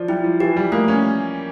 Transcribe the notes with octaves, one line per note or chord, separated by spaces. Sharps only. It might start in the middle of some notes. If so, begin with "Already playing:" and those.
Already playing: F3 D5
G3 E4
F3
E3 G4
G3
A3 A#3
C#4